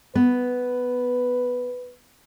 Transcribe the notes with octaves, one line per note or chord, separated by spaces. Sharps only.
B3 B4